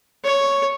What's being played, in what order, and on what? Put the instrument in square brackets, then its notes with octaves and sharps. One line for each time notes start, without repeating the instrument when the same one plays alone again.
[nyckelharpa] C#5